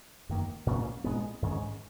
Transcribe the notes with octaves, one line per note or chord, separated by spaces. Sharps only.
F#2 D#3 A#3
A#2 A#3 C#4
A#2 G#3 B3
G#2 D#3 G#3 C#4